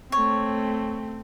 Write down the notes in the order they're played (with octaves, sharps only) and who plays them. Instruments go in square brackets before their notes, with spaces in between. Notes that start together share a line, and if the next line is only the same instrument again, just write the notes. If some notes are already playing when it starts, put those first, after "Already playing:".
[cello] A3 C4 [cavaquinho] C#5